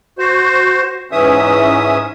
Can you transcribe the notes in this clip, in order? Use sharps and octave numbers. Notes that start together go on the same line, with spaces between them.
F#4 C5
G#2 E3 C#4 E5 D#6